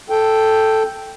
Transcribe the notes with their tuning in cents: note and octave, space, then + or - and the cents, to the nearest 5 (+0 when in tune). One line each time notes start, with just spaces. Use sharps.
A4 +0 G5 +0